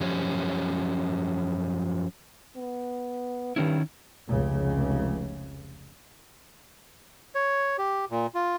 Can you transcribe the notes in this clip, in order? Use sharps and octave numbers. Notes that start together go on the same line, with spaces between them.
F#2 F3 C#4 G4 C#5
B3
G2 D#3 C#4 E4
F1 C#2 C#3
C#5
G4
A#2
F4